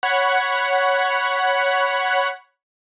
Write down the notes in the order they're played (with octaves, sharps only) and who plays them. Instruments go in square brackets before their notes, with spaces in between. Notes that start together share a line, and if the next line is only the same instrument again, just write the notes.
[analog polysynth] C#5 F#5 B5